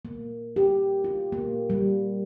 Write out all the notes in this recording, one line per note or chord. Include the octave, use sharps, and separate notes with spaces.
A#3
G4
F4
A#3
G3